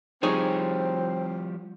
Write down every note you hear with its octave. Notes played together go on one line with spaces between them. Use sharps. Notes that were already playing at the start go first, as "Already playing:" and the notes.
F3 G3 C4 D#4 G#4 C#5